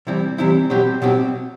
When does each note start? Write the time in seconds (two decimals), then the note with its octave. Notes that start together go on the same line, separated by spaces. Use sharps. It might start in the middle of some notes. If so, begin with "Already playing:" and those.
0.07 C3 E3 G3 C4 E4
0.38 C3 E3 G3 C4 E4
0.70 B2 F#3 C4 G4
1.02 B2 F#3 C4 G4